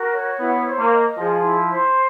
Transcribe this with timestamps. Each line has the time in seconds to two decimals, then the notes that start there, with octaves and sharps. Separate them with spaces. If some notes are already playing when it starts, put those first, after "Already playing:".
Already playing: F#4 A#4
0.13 C#5
0.39 B3 E4
0.66 C5
0.78 A#3
0.92 D#5
1.18 F3 G#4
1.43 E4
1.70 C5